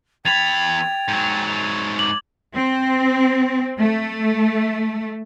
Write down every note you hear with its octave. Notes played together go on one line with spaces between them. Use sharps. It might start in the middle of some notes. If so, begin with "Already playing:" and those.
E2 G5 B5 G#6 A6 F7
G#2 F#3
D6 F#7
C4
A3